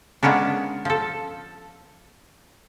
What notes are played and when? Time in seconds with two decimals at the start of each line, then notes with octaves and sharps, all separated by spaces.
0.23 G#3 A#3 B3 C#4 D4
0.85 F3 A4